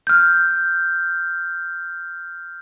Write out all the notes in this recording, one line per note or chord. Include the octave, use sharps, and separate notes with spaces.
F6 G6